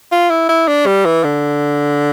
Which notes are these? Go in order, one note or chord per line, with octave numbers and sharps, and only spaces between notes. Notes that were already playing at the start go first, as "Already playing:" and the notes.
F4
E4
E4
D4
G3
E3
D3